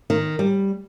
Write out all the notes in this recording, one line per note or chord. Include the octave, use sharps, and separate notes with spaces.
D#3
G3